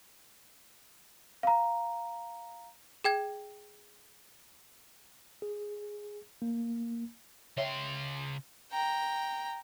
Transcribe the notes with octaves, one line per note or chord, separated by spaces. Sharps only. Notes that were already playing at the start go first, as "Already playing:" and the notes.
F5 A#5
G#4 G5 G#6
G#4
A#3
C#3 C#5 E5 G5 C6
G5 A#5